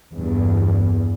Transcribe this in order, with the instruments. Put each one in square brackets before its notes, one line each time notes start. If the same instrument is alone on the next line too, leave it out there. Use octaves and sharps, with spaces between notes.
[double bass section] E2 G2